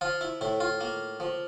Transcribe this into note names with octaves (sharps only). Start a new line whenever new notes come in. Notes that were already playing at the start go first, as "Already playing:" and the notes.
F3 F4
E4
A2 E4
F4
A#3
F3